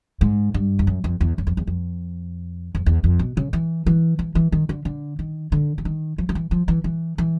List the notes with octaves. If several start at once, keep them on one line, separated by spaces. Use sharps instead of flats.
G#2
G2
F2
F#2
F2
E2
F#2
F2
E2
F2
F2
E2
F2
B2
C#3
E3
E3
E3
E3
D#3
D3
D3
D#3
D3
E3
D#3
F3
F3
E3
F3
E3
E3
E3